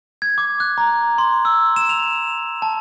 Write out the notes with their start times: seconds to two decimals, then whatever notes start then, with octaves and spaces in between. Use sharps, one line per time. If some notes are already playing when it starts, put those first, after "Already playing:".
0.22 G#6
0.38 D6
0.60 F#6
0.78 A#5
1.18 C6
1.45 E6
1.76 E7
1.89 F7
2.62 A5